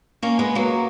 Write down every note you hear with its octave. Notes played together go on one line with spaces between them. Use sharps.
A#3 C#4
G#3 B3
F#3 A#3